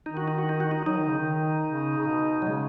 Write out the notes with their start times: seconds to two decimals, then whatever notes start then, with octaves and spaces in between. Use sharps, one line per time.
0.06 D#3 D#4
0.17 F#4
0.28 D#4
0.38 F#4
0.49 D#4
0.60 F#4
0.71 D#4
0.86 F#3 D#4
0.97 D#3
1.08 C#3
1.18 D#3
1.67 C#3
1.97 C#3
2.07 B2
2.42 F#3
2.47 C#3 G#3